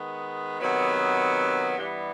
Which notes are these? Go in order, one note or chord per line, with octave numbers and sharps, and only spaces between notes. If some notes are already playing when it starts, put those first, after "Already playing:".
Already playing: D#3 G#3 B3
C3 D#3 F#3 B3
G2 E3 G3 B3